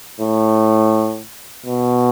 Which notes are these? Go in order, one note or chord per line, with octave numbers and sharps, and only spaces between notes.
A2
B2